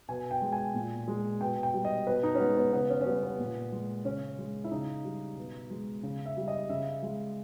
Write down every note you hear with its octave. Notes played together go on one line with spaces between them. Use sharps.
B2 G#5
G5
G#3
G#5
A#2
G#3
B2 G5
G5
G3
D#5
B2 B4
D#4
C#4
G#3 B3
B3
C#3 B3
C#4
C#4
G3 B3
B3
A#2
G#3
C#3 C#4
G#3
E4
C#3 D#4
G3
B2
G#3
C#3
E5
G3
D#5
C#3 E5
G#3